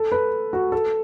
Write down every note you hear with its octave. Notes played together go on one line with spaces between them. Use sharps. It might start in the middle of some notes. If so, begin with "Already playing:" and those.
Already playing: A4
B4
F#4
A4